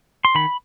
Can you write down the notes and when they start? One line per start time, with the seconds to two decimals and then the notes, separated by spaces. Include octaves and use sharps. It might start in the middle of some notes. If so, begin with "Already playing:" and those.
0.25 C6
0.35 D#3 B5